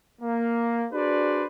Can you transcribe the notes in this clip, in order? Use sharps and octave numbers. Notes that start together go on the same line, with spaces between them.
A#3
D4 F#4 G#4 B4 C5 D5